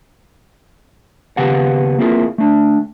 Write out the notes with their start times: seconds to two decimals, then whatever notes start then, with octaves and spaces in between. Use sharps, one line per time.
1.37 D#2 C#3 B3 G4 F5 F#5
1.98 A#3 C4 E4 F4 G#4 A#4
2.38 A3 D4